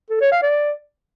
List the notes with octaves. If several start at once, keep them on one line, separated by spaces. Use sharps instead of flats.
A4
C#5
F5
D5